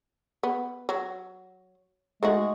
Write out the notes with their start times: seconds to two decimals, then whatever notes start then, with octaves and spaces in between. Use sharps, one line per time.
0.43 B3
0.89 F#3
2.23 G#3 A3 D#4 F#4